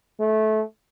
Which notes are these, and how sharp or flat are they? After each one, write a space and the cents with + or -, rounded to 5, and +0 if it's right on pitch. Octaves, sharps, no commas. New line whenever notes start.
A3 -20